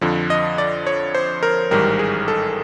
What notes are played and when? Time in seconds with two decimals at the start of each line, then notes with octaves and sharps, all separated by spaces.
0.01 F2 D3 F3
0.30 D#5
0.58 D5
0.87 C#5
1.15 C5
1.43 A#4
1.71 A1 G#2 D#3 G3 A#4
1.99 G#4
2.28 A4